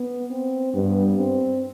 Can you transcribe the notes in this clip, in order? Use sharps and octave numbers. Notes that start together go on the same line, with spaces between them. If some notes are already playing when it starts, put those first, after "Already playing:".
Already playing: B3
C4
G2 B3
C4